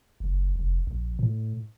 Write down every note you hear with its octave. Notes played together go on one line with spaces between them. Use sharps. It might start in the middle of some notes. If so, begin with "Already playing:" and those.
F#1
F1
A#1
A2